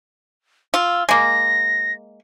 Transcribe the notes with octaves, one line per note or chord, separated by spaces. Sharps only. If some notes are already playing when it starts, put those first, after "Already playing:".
F4 E6
G#3 A#3 A#6